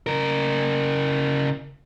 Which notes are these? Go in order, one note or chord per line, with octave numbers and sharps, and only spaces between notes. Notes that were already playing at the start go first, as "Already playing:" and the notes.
C#3 A#4